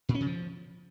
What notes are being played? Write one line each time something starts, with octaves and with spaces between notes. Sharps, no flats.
A#2
C#4
C#3
F3